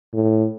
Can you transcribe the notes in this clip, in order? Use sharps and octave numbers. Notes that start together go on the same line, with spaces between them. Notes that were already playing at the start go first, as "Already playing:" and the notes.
A2